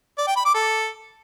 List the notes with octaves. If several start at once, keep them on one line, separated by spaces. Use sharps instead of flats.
D5
G5
B5
D6
A4